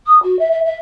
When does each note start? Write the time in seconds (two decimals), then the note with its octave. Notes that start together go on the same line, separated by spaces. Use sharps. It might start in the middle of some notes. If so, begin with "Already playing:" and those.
0.07 D#6
0.23 F#4
0.39 E5
0.51 E5
0.65 E5